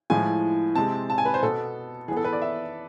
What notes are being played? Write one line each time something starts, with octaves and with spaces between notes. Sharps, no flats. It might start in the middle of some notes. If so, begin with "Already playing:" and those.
A2 F3 G#3 G#5
C3 G#3 C4 A5
A5
G#5
B4
C5
B2 B3 A4
E3 B3 G#4
A4
B4
D5
E5